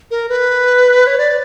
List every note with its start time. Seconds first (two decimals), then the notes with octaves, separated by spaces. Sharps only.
0.11 A#4
0.29 B4
1.07 C#5
1.18 D5